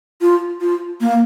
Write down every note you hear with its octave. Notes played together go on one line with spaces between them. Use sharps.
F4
F4
A#3